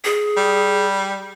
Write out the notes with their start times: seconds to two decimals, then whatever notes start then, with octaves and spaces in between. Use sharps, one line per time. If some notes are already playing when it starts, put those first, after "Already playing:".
0.04 G#4
0.37 G3